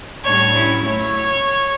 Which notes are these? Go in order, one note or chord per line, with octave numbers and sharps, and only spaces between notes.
A2 G3 D4 C#5
F#3 C#4 E4
F#3 A3 E4 C#5